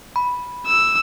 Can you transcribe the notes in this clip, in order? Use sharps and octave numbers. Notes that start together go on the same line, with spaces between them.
B5
E6